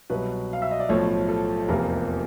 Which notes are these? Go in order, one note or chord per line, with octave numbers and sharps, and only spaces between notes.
C2 B2 F#3 B4
F5
E5
D#5
D5
B1 A2 F3 A3 C#5
A4
F1 E2 C3 F3 A#3 A#4